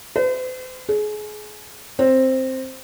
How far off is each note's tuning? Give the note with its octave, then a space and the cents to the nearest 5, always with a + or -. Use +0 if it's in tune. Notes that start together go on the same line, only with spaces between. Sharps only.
C5 -45
G#4 +30
C4 +5